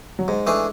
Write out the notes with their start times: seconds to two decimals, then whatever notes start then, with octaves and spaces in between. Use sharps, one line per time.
0.19 F#3
0.28 G#2 G#3
0.47 E3 A3 D4 G#4